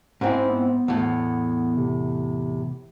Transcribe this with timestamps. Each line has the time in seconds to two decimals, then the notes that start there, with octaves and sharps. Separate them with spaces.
0.21 G#2 C4 C#4 E4
0.49 B3
0.88 E2 A2
1.77 C3